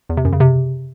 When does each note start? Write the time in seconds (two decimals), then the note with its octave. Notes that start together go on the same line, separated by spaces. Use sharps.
0.09 E2
0.17 C3
0.25 F#2
0.33 C#3
0.40 C3